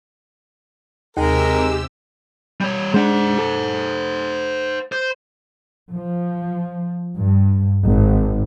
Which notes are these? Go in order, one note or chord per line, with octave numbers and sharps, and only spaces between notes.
D#2 C3 G#3 D#4 G4 A#4 E6
G3 C#5
G#3 D4 C5 F#5
A4
C5
F3
G2
G#1